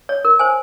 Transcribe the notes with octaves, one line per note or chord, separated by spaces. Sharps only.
C#5
A#4
C5 G#5